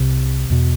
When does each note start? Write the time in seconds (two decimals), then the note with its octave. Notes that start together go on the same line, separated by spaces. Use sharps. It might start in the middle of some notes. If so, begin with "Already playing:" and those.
Already playing: C2 C3
0.50 E2 B2